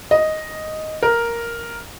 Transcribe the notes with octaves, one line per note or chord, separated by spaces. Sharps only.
D#5
A#4